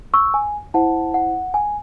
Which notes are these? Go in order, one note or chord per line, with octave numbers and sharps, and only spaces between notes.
C#6 E6
G#5
E4 C5 F#5 A5
F#5
G#5